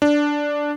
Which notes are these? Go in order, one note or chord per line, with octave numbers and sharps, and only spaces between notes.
D4